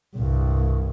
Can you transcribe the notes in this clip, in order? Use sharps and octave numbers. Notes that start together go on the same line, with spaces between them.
C2 G2